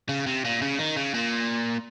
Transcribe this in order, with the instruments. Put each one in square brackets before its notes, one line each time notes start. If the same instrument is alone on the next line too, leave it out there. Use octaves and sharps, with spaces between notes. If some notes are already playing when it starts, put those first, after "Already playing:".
[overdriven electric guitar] C#3
C3
A#2
C#3
D#3
C#3
A#2